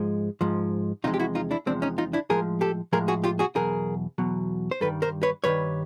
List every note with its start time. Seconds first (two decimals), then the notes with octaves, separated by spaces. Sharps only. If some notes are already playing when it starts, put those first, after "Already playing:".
Already playing: G#2 F3 G#3
0.41 G#2 F3 G#3
1.04 E2 C3 F3 G#3 D#4 F4
1.14 G4
1.20 E4 F#4
1.35 D#4 F4
1.51 D4 E4
1.66 E2 C3 F3 G#3 C4 D4
1.82 C#4 D#4
1.98 D#4 F4
2.13 D4 E4
2.30 A2 F3 G#3 G#4 A#4
2.61 G4 A4
2.93 A2 F3 G#3 G#4 A#4
3.08 F#4 G#4
3.24 F4 G4
3.39 F#4 G#4
3.55 E2 B2 F#3 G#4 A#4
4.18 E2 B2 F#3
4.71 C5
4.81 G2 D#3 G3 A4 B4
5.02 A#4 C5
5.23 B4 C#5
5.44 G2 D#3 G3 B4 C#5